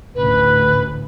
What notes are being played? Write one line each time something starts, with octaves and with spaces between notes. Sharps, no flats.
A1 D2 A2 B4